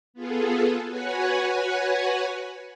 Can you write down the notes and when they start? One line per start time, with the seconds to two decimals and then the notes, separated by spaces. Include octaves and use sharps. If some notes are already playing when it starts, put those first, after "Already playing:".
0.14 B3 F4 G#4 A4
0.85 F#4 B4 C#5 F#5 G#5